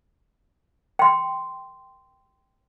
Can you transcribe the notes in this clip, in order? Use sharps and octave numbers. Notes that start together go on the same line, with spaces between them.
G5 C6